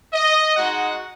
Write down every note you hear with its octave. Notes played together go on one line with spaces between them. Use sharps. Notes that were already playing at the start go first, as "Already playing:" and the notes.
D#5
G#3 D#4 F#4 F#5